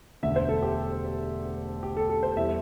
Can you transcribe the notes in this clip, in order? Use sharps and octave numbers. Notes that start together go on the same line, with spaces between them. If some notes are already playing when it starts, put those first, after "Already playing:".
E1 D2 D3 E5
C5
A4
G4
G4
A4
A4
C5
E2 E3 G3 E5